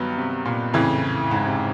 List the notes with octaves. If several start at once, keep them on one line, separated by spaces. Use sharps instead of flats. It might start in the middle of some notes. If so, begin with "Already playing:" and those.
Already playing: G2 D#3 F#3 B3
C3
A#2
F2 A2 C#3 E3
G#2
C3